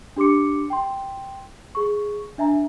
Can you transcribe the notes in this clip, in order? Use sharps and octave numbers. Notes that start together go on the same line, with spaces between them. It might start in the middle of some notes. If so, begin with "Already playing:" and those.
D4 G4 C6 D6 C#7
G5 C6
G#4 C#6
D4 E5 G#5 A#5